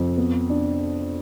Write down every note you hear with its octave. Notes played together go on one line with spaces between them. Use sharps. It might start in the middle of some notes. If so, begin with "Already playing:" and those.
Already playing: F2
B3
D4